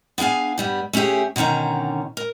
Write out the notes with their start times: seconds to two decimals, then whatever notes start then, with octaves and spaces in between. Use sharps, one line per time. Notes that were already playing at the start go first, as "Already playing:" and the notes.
0.18 B3 D4 G#4 F5 G#5
0.58 G2 G3 B3
0.93 A3 C#4 F4 G4 G#4
1.36 B2 D3 D#3 C#4 A#5
2.17 A#4